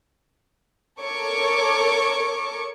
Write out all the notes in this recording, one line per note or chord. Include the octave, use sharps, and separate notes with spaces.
A4 A#4 C#5 C#6 D6